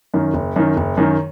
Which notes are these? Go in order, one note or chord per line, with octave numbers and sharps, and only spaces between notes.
F#2 D#3
F#1
F#2 D#3
F#1
F#2 D#3